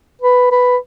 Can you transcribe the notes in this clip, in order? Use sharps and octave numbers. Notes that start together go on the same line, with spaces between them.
B4
B4